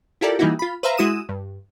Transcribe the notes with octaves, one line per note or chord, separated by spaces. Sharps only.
E4 F4 G4 A4 A#4 D5
E3 G3 A#3 D#4 E4 F#4
F4 B5
B4 C5 E5 F5 A#5
G#3 E4 F#4 D#6 D#7 E7
G2